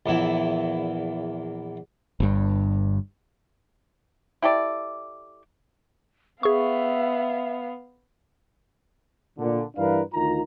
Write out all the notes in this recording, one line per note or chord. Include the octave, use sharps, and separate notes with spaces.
A#1 E2 E4
G1 G2
E4 G4 A4 D5
B3 G#4 E5 F5 C#6
A#2 D3
G2 E3 D4 A#4 B4 F5
D2 D#3 F4 A#5